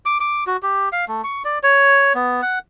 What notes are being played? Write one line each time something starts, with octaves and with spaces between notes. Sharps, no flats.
D6
D6
F#4
G4
F5
A3
C#6
D5
C#5
B3
F#5